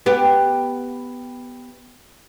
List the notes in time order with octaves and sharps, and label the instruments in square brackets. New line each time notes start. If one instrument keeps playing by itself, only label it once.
[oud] B3 G4